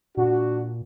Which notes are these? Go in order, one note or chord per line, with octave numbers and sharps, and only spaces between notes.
A#2 D4 F#4